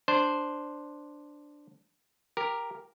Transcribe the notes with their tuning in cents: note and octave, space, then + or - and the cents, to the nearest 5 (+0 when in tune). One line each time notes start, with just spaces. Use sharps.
D4 +0 C5 +0
G4 +5 A#4 +0